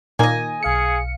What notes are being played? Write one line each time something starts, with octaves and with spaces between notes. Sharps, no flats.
A#2 D#3 A#3 D#5 G#5
B1 G#4 F5 C#7